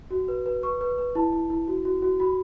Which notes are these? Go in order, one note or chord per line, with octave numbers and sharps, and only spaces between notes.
F#4
B4
B4
B4 C#6
B4
B4
E4 A5
E4
E4
F#4
F#4
F#4
F#4 B5